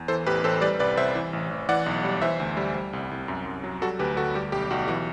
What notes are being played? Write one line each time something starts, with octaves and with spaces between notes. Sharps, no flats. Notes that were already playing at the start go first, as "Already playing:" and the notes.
Already playing: E2
E3 A4 C5
A1 G4 B4
A1 A4 C5
G3 B4 D5
C2 B4 D5
C2 C5 E5
E3
A1
A1
E3 D5 F#5
B1
G3
E3 C5 E5
D2
G3
G3
C2
C2
F#2
F#2
F#3
G3 F#4 A4
D2 G4 B4
D2 F#4 A4
G3 G4
B1 G4
B1 F#4
E3 F#4